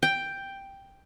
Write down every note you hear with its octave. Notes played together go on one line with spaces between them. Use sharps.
G5